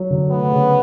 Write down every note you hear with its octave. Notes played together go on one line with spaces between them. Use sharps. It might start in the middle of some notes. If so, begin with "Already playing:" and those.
Already playing: F#3
D3
A3 B3
C#3